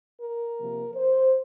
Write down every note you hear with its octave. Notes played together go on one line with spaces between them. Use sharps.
A#4
C3 F3 A#3
C5